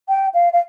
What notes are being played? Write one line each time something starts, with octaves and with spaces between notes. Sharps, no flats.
G5
F5
F5